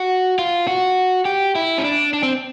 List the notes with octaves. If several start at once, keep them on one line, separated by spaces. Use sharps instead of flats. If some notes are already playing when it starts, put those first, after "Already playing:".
Already playing: F#4
F4
F#4
G4
E4
C#4
D4
D4
C4